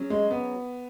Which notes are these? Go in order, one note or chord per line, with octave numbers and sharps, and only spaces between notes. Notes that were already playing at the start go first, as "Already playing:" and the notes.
Already playing: F#3 C#4 G#4
G#3
B3